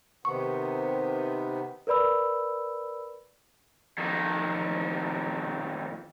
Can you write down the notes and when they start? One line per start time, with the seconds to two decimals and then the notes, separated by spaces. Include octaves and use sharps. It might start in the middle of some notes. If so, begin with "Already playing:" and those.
0.25 C3 D#3 B3 C#6
1.87 A#4 B4 D5 B5 E6
3.98 F2 D#3